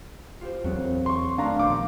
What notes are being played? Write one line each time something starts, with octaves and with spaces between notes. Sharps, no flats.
F4 G4 C5
E2 A#2 F#3 C4
C6 C#6
D#3 A3 D4 F5 A#5
A#1 B3 F#4 D6 G6